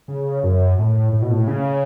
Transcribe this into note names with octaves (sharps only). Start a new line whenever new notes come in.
C#3
F#2
A2
A2
B2
A2
C#3